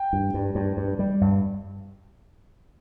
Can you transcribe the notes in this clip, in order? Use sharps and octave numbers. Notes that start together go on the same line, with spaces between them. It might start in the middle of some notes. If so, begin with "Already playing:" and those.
Already playing: G5
G2
G2
G2
G2
G3
G2